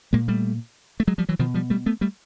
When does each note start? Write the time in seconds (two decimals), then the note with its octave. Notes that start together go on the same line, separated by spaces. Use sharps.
0.13 A#2 G#3 A#3
0.28 G3 A3
1.00 A3
1.08 F#3 G#3
1.18 F3 G3
1.29 E3 F#3
1.39 B2 D#3 F3
1.54 F3 G3
1.70 G3 A3
1.86 A3 B3
2.01 G3 A3